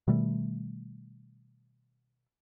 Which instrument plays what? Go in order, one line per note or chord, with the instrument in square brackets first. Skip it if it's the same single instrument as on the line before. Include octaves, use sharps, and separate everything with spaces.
[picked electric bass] B2 D#3 G3 A3